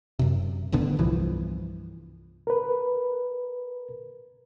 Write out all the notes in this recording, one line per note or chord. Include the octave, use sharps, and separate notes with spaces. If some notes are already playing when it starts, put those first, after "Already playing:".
F#2 C3
D#1 A1 D3 B3
C2 G2 E3 F3
A#4 B4